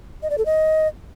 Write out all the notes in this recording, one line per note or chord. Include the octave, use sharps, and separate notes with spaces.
D#5
D5
A4
D#5